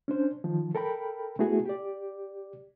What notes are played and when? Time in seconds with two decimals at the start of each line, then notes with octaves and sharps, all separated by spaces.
0.08 C#4 D4 C5
0.44 D#3 F3
0.75 A4 A#4 G5 B5
1.39 A3 B3 E4 F#4 G#4
1.66 G4 D5